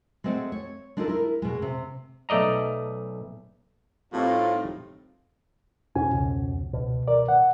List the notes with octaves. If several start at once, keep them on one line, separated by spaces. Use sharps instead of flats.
G#3 A3 C4 C5 F#5
C#5
G#3 D4 D#4 F4 A4 A#4
E4 A#4
B2 G#3
C3
B1 A3 D5 D#5 A#5
A2 G3 A3 C4 D#4 F4 G4
F2 B2 C#4 G#5
C#2
B2
A#4 D5
F#5